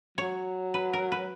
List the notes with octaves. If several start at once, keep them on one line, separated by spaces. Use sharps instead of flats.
F#3 C#5
B4
A#4
B4